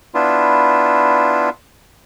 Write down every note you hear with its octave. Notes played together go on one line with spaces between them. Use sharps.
B3 D4 E4 F4